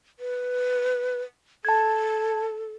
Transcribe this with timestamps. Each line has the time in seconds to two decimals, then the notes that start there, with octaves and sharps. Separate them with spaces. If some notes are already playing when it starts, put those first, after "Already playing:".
0.19 B4
1.65 A4 A5 G#6